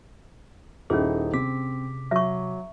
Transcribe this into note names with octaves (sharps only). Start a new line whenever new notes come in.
D#1 C#4 D#4 E4 G#4 A4
C3 C4 D6 B6
F#3 E5 C#6